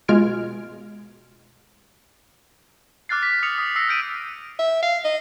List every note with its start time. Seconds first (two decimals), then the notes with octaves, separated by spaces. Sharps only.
0.08 B2 G#3 F4 F6 G#6 D7
3.09 D6 F6 F#6 A6 C7
3.23 B6
3.43 D#6 C#7 F7
3.58 D#6
3.76 E6 A#6 C7
3.88 F6 G6 D7 D#7
4.59 E5
4.82 F5
5.04 D#5